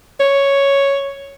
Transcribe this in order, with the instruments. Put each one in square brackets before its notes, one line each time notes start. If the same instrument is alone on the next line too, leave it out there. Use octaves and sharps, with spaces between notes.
[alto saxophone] C#5